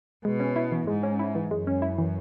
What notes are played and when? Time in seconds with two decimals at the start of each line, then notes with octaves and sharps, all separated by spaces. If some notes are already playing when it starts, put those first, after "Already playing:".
0.25 B2 G#3
0.40 C#4
0.56 E4
0.72 E3
0.87 G#2 G#3
1.03 C#4
1.19 E4
1.35 E3
1.51 F#2 G#3
1.67 C#4
1.82 E4
1.98 E3